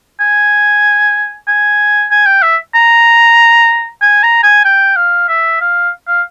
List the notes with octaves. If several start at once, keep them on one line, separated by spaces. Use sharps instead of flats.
G#5
G#5
G#5
G5
E5
A#5
G#5
A#5
G#5
G5
F5
E5
F5
F5